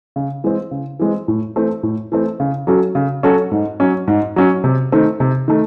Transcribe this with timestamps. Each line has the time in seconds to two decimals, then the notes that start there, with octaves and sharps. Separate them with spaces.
0.16 C#3
0.44 E3 G#3 C4
0.71 C#3
0.99 E3 G#3 C4
1.28 A2
1.56 E3 A3 C4
1.83 A2
2.12 E3 A3 C4
2.40 C#3
2.67 F#3 C#4 F#4 A4
2.95 C#3
3.23 F#3 C#4 F#4 A4
3.51 G#2
3.80 F#3 C#4
4.08 G#2
4.36 F#3 C#4
4.64 C3
4.92 D#3 A3 C4
5.20 C3
5.48 D#3 A3